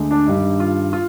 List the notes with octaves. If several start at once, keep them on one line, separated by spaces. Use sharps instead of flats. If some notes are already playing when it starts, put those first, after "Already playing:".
Already playing: D2 D3 G#3
D4
G2 D#3 G3 D#4
F4
F4